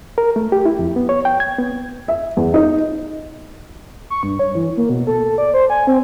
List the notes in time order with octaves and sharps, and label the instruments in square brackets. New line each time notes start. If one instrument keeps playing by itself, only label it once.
[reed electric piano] A#4
A3
G4
E4
F2
B3
C#5
G5
G#6
B3
[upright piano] E5
E2
D#4
[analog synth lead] C#6
G2
C#5
E3
A#3
B2
A4
A4
D5
C5
G#5
C4